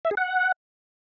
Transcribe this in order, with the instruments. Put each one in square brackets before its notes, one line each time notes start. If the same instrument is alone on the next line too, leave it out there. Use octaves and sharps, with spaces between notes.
[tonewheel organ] E5
G#4
F#5